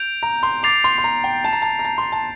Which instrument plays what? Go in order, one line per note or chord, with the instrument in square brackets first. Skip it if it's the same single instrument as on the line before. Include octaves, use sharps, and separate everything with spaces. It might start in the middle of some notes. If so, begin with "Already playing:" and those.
Already playing: [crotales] G6 D7 F7
[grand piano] A#5
C6
[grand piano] D6 [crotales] A6 C7 F7
[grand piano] C6
C6
A#5
G5
A5
A#5
A5
A#5
A5
C6
A5